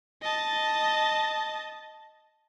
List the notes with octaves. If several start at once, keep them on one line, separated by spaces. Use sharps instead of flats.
D#5 A5